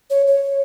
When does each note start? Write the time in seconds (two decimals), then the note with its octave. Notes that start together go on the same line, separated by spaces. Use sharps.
0.10 C#5
0.27 C#5